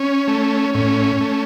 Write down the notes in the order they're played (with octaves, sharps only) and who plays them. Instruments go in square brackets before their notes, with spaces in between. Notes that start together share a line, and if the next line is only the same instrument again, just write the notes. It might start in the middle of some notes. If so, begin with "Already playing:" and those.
Already playing: [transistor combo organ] C#4
A3
A2 C#4
A3